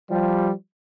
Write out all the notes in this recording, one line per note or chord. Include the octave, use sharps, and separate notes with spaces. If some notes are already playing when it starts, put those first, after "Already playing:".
F3 G3